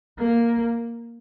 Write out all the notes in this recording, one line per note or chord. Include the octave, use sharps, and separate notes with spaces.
A#3